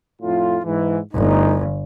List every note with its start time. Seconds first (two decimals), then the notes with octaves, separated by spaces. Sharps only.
0.22 F2 A2 F4
0.64 G#2 E3
1.14 G1 G3 A3 D#4